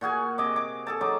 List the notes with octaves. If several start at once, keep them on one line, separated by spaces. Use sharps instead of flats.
A#2 F#4 G#4 G#5
C3 D#5 D6
D6
G#4 A4 A5
F#3 D#4 D6